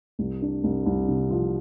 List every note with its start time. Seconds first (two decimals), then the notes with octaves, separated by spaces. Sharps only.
0.19 C2
0.42 D4
0.64 C2
0.86 C2
1.08 C3
1.30 F3